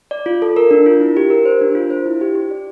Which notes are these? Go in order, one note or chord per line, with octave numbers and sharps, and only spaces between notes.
D5
F4
A4
A#4
D4
F4
E4
G4
A#4
C5
D4
F4
C5
E4
G4
G4
D5